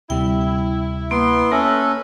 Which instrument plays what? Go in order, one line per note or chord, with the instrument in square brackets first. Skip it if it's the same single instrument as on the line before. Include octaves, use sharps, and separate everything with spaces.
[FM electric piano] D2 C3 G3 [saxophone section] E4 [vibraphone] G5
[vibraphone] A#3 [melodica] B3 C6
[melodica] C#4 A4 [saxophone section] B4 E5 [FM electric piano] A#6